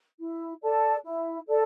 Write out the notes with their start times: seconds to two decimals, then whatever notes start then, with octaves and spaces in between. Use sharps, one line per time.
0.19 E4
0.63 A4 D5 A5
1.04 E4
1.47 A4 D5 A5